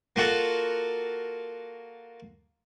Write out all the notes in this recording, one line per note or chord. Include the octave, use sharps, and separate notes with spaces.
A#3 F4 F#4 A4